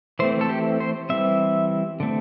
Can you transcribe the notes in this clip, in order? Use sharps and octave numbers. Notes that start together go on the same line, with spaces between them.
E3 A3 C4 C5
A4
G4
C5
E3 G3 C4 E5
D3 A3 C4